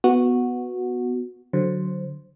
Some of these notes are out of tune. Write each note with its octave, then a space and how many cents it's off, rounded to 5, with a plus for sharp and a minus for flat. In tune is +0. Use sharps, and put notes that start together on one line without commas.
B3 +0 F#4 -10
D3 +0 F#3 +0 C5 +0